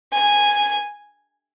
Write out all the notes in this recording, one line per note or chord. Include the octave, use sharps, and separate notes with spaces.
G#5